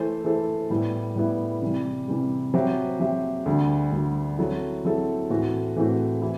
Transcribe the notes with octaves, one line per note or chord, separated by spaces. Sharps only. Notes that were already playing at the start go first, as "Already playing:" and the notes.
Already playing: E3 A3 E4 A4 C5
E3 A3 E4 A4 C5
A2 G3 B3 E4
A2 G3 B3 E4
C3 E3 G3
C3 E3 G3
F#3 C4 G4 C5 E5
F#3 C4 G4 C5 E5
D2 D3 G3
D2 D3 G3
F#3 C4 E4 A4
F#3 C4 E4 A4
A2 E3 A3 C4 F#4
A2 E3 A3 C4 F#4
E3 E4